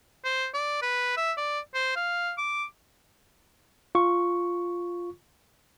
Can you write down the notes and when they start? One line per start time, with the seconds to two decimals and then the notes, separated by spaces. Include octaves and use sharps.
0.24 C5
0.54 D5
0.82 B4
1.17 E5
1.37 D5
1.74 C5
1.96 F5
2.38 D6
3.95 F4 C#6